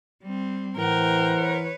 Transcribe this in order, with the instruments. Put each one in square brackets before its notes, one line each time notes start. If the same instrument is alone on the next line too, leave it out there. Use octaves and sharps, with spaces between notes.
[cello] G3 C4
[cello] A2 G5 [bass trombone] E3 [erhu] A#4 [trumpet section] C5 F#5
[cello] B4 C#5